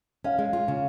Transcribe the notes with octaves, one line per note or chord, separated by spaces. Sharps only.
C#4 F5
G#3
F4
C#3